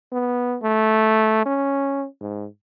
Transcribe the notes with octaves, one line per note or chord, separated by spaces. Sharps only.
B3
A3
C#4
G#2